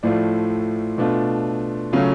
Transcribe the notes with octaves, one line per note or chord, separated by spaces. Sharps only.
A2 F3 A3 F4 D5
B2 A3 D4 F4
C#3 F#3 A3 C#4 F4 F5